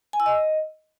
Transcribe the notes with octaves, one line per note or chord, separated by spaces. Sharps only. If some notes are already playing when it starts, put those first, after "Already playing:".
G#5
E6
D#5